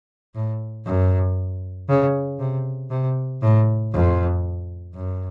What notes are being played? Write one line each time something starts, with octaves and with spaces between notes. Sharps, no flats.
A2
F#2
C#3
C3
C3
A2
F2
F#2